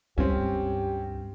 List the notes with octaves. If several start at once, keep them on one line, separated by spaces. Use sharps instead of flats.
C#2 G2 C4 C#4 G4